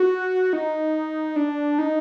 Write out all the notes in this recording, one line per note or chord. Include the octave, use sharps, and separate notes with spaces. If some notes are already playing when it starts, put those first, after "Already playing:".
Already playing: F#4
D#4
D4
D#4